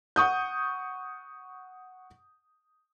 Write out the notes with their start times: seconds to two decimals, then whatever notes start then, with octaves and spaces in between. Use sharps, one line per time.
0.16 F#5 C#6 D#6 G6